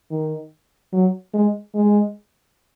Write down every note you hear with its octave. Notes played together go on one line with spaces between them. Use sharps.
D#3
F#3
G#3
G#3